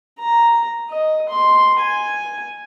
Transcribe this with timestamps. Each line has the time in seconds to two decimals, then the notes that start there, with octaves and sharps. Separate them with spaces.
0.19 A#5
0.90 D#5
1.29 C6
1.80 G#5